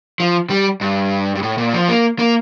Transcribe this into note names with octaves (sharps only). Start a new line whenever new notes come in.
F3
G3
G2
G2
A2
A#2
F3
A#3
A#3